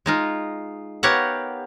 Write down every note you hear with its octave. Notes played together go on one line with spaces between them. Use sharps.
G#3 D#4 F4
B3 G4 A#4 C#5 F5 F#5